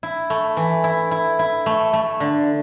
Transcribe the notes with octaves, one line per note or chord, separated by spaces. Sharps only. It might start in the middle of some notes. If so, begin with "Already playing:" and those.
E4
A3
E3
E4
E4
E4
A3
A3
D3